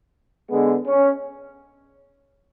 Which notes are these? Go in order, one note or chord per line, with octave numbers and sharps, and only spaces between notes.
D3 G#3 B3
C#4